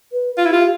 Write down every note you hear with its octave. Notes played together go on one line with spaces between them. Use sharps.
B4
F4
E4
F4 G4